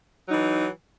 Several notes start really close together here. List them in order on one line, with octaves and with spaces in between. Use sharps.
F#3 D#4 E3